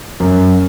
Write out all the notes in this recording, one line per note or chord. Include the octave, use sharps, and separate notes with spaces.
F#2